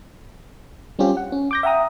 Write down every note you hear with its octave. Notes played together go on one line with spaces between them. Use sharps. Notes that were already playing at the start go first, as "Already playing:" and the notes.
G3 C4 C#4 F4 G4
F#5
C#4
D6 G6 A#6
E5 F#5 G5 A#5 D#6